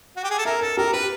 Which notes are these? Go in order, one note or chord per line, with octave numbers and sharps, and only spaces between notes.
F#4
G4
G#4
A4
A#4 E5
A4 A#4
G4 A#4
G4 B4